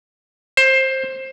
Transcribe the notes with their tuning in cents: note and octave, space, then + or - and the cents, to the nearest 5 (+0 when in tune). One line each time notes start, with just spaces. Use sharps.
C5 +15